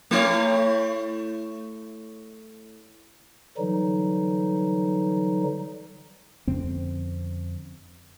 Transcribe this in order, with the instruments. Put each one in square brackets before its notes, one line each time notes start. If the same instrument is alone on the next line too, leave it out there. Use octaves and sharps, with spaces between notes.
[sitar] A3 E4 C#5
[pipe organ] D3 E3 F#3 G3 D#4
[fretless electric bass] F2 D3 C4 C#4